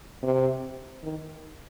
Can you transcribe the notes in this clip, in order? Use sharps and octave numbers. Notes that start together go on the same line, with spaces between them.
C3
D#3